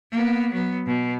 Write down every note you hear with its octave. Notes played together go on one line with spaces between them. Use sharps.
A#3 B3
F#3 B3
B2